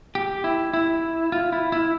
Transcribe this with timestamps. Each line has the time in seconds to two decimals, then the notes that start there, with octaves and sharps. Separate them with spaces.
0.15 G4
0.44 E4
0.74 E4
1.32 F4
1.52 E4
1.72 E4